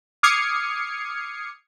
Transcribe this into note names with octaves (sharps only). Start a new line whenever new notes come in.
D6 D#6 F6 G#6 C7 C#7